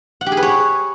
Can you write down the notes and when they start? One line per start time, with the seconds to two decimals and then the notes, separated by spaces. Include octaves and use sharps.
0.21 F#5
0.26 G4
0.32 G#4
0.37 B4
0.42 C#5